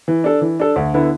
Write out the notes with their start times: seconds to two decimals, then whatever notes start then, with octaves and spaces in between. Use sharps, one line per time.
0.08 E3
0.24 D4 A4
0.41 E3
0.60 D4 A4
0.76 D2
0.94 D3 B3 E4